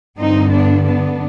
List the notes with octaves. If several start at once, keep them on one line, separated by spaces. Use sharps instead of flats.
G2 D3 C4 D#4
B3 D4
B3 D4